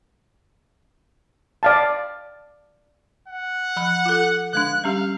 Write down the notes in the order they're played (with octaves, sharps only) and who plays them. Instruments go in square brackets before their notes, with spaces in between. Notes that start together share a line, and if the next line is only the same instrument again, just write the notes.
[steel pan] D5 F5 A5
[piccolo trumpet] F#5
[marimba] F3 B5 F#6
F4 A4
[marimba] D3 G#3 D4 [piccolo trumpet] F#6
[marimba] G3 C#4 G4 [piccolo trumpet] F5